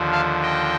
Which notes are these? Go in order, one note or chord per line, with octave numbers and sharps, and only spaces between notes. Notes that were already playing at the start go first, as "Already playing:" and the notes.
Already playing: D#2 D3 F3
F5 A5
D#5 G5